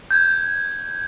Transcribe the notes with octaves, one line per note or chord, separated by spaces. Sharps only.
G6 G#6